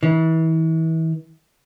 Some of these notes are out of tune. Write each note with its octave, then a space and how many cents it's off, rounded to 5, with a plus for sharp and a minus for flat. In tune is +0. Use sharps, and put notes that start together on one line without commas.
E3 -35